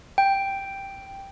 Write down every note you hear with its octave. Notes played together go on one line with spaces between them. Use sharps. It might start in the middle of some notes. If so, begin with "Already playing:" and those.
G5